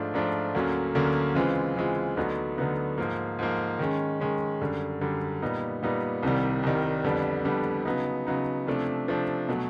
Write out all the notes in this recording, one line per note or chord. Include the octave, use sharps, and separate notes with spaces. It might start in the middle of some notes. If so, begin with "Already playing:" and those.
Already playing: G#2 F3 A3 D4 F4
G#2 F3 A3 D4 F4
D2 D3 F#3 A#3 C#4
D2 D3 F#3 A#3 C#4
C#3 E3 G#3 C4 F4
C#3 E3 G#3 C4 F4
D2 D3 F#3 B3 D#4
D2 D3 F#3 B3 D#4
G#2 F3 A#3
G#2 F3 A#3
D#3 G#3 C#4
D#3 G#3 C#4
F#2 D3 G3
F#2 D3 G3
A#2 G3 B3 D#4
A#2 G3 B3 D#4
C2 C3 D#3 G3
C2 C3 D#3 G3
F2 D3 G3 B3 D4
F2 D3 G3 B3 D4
C#3 F#3 B3 D#4
C#3 F#3 B3 D#4
C3 F3 A3 D4
C3 F3 A3 D4
B2 F#3 A3